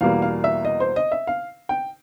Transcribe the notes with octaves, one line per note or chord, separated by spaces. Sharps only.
E2 B2 G3 A#3 F5
F5
E5
D#5
C5
D#5
E5
F5
G5